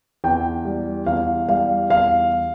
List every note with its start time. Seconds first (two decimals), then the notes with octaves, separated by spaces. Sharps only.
0.24 E2 G5
0.65 G3
1.06 E2 F5
1.49 G3 F5
1.90 E2 F5